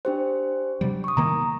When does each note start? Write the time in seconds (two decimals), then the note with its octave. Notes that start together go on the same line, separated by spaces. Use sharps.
0.05 D4 G4 C5
0.81 C3 F#3 G3
1.04 C#6 D#6
1.17 C3 D#3 A#3 A#5